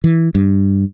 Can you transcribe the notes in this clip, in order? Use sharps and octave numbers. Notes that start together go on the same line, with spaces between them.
E3
G2